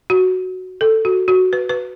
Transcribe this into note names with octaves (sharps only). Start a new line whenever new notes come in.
F#4
A4
F#4
F#4
B4
B4